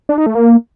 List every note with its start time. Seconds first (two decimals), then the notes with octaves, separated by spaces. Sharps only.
0.09 D4
0.18 D#4
0.26 A3
0.35 A#3